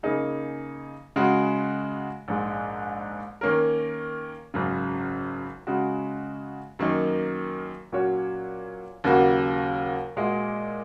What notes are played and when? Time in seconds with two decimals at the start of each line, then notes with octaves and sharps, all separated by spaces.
0.03 C#3 A#3 D#4 G#4
1.16 C#3 G#3 F#4
2.28 A#1 G#2 G#3
3.41 D#3 A#3 C#4 A#4
4.54 G#1 F#2 C#3
5.67 C#3 G#3 F#4
6.79 F#2 D#3 A#3 D#4
7.92 A#2 F#3 C#4 F#4 C#5
9.04 D#2 C#3 F#3 A#3 F#4
10.17 A#2 G#3 F#4 D#5